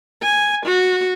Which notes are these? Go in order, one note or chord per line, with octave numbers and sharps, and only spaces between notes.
G#5
F#4